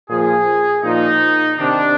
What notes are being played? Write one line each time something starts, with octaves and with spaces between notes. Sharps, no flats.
A#2 F3 G#4
A#2 F3 D#4
C3 D#3 D4